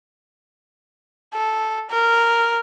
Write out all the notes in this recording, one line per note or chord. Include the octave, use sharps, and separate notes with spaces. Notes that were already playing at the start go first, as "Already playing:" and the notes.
A4
A#4